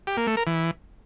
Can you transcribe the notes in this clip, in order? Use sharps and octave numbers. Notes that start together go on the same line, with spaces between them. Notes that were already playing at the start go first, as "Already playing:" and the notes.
G4
A#3
A3
A#4
E3